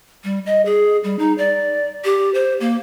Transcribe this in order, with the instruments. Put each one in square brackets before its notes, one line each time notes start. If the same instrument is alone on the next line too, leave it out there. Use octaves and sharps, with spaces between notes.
[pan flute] G3
D#5
G#4
G3
D#4
D5
G4
C5
A#3